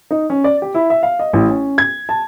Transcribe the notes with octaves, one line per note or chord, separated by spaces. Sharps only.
D#4
C#4
D5
G4
E4
E5
F5
D#5
A1
C#4
G#6
A5